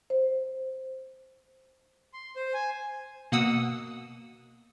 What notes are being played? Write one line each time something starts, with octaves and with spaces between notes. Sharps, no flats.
C5
C6
C5
G#5
B2 A#3 F#5 D#6 E6